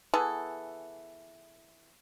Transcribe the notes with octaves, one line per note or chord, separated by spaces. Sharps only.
E3 B3 G#4 A4